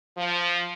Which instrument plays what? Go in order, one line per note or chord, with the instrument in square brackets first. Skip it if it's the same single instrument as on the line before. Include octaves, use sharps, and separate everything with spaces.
[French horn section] F3